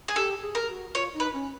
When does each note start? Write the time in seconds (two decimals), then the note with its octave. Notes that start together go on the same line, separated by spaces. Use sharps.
0.08 G#4
0.16 G4 A4
0.42 G#4
0.55 A#4
0.68 F#4
0.95 F4 C#5
1.14 D#4
1.20 B4
1.33 C#4